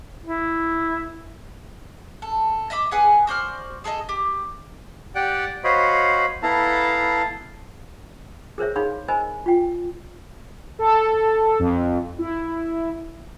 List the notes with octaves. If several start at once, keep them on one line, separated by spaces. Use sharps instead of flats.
E4
A4
D#5 E5 B5 D6
G#4 B4 F#5 G#5
F#4 C5 D5 F6
G#4 A4 D5 D#5
G4
G4 D5 F#5 G5
F#4 C5 C#5 D#5 F5 B5
B3 E4 A4 F5 A5 A#5
G#4 A#4 C5 C#5 E5
D#4 G#4 C#5 F5 B5 C6
A#4 C5 D#5 G#5 B5
F4 G5
A4
F2
E4